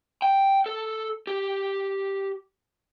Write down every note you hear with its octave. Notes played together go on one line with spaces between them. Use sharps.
G5
A4
G4